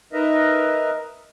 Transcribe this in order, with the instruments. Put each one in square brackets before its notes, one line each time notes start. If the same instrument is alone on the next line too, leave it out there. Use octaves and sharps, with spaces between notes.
[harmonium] D#4 A#4 B4 D#5 E5 A#5